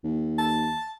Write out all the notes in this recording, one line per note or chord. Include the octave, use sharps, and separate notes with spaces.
D#2
A5